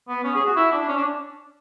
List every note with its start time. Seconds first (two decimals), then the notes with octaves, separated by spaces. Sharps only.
0.09 B3
0.24 C#4
0.36 G#4
0.46 F#4
0.57 E4
0.72 D4
0.88 C#4
0.97 D4